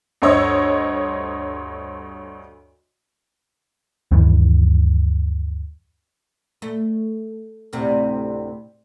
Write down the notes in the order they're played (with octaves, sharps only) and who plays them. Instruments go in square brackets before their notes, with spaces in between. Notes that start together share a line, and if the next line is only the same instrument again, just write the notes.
[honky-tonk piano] D2 G2 C5 C#5 D#5 E6
[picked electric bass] D2 G2 D#3 E3
[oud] A3
D2 A2 C3